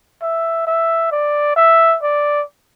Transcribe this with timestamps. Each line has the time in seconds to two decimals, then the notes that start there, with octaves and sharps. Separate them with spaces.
0.22 E5
0.67 E5
1.12 D5
1.56 E5
2.03 D5